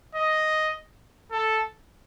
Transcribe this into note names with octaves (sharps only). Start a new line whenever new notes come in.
D#5
A4